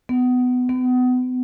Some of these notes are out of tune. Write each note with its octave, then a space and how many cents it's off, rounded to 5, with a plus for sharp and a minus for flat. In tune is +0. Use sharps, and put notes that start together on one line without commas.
B3 +20
B3 +35